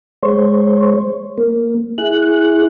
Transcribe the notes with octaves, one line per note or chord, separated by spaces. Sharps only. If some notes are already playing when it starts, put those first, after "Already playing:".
G#3 C5 C#5
A#3
E4 G#4 F#6